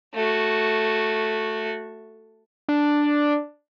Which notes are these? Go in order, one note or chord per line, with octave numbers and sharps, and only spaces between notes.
A3 F#4
D4